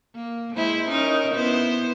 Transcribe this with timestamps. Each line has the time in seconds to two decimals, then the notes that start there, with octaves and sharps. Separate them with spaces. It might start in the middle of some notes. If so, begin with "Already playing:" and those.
0.16 A#3
0.56 G#3 E4 C5
0.90 C#4 D#4 A#4
1.34 B3 E4 C5